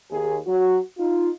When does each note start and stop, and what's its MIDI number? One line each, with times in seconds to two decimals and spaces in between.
0.11 0.36 39
0.11 0.36 68
0.46 0.78 54
0.46 0.78 66
0.97 1.29 63
0.97 1.29 65